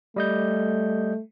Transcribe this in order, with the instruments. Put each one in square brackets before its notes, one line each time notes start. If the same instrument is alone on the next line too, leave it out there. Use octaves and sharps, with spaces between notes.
[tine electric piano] G3 D#5 G6 [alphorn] A3